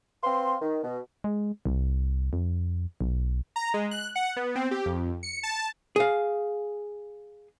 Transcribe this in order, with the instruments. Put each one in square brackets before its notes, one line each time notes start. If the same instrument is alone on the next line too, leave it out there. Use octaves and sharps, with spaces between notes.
[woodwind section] C4 B4 F5 C6
D#3
B2
[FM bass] G#3
C2
F2
B1
[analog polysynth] A#5
G#3
F#6
F#5
B3
C4
G4
F2
C#7
A5
[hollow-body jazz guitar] G#4 F5